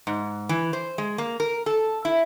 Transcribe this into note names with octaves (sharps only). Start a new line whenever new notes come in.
G#2
E3
C5
G#3
A#3
A#4
A4
E4